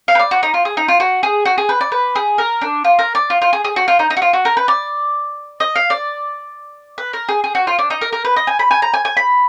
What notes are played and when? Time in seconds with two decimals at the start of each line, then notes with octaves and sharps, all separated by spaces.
0.08 F5
0.15 B4
0.19 D5
0.31 F#4
0.43 D#4
0.54 F4
0.65 G#4
0.77 D#4
0.88 F4
1.00 F#4
1.23 G#4
1.45 F#4
1.58 G#4
1.69 B4
1.81 D5
1.92 B4
2.16 G#4
2.38 A#4
2.62 D4
2.84 F4
2.99 A#4
3.15 D5
3.30 F4
3.42 F4
3.53 G#4
3.65 G#4
3.76 F#4
3.88 F4
3.99 D#4
4.10 D#4
4.17 F#4
4.22 F4
4.33 F#4
4.45 A#4
4.57 B4
4.68 D5
5.60 D#5
5.75 F5
5.90 D5
6.98 B4
7.13 A#4
7.29 G#4
7.44 G#4
7.55 F#4
7.67 F4
7.79 D4
7.90 D#4
8.01 A#4
8.13 A#4
8.25 B4
8.36 D#5
8.47 G#5
8.59 B5
8.71 G#5
8.82 A#5
8.94 G#5
9.05 G#5
9.17 B5